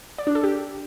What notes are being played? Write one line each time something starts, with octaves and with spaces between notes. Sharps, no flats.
D5
D4
A4
G4